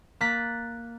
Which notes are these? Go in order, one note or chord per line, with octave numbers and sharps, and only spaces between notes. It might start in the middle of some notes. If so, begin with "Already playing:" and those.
A#3 A#5 F#6 A6 B6